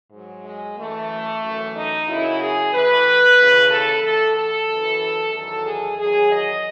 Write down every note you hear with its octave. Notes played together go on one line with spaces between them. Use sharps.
G#2 F#3
G#3
F#2 E3 A3
F#2 E3
D#4
F#2 C#3 F#3 E4
G#4
A2 E3 B4
D#2 C#3 E3
A4
A2 E3 A4
A4
F#2 E3
E2 D#3 F#3 A4
G#4
E2 D#3 F#3 G#4
D#5